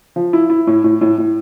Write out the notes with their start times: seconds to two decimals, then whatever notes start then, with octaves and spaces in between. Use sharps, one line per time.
0.16 F3
0.33 E4
0.50 E4
0.67 A2
0.84 A2
1.01 A2
1.18 A2